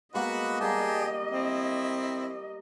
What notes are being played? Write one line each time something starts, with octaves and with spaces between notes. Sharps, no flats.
G#3 A#3 B3 F#4 B4 D#5
G3 A#3 G4 G#4 A5
C4 E4